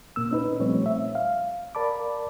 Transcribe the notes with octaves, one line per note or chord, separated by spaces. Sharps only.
A#2 A#3 E6
C#4 D#4 B4
A#2 F3 G3 A3 C4 C#5
E5
F5
A#4 D5 A5 B5 D6